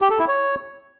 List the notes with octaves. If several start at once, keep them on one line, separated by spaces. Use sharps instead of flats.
G4
A4
E4
C#5